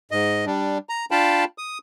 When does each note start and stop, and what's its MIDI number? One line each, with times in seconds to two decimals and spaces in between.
0.11 0.45 44
0.11 0.45 75
0.46 0.78 55
0.46 0.78 62
0.89 1.05 82
1.11 1.45 62
1.11 1.45 65
1.11 1.45 77
1.11 1.45 79
1.11 1.45 81
1.11 1.45 83
1.58 1.78 87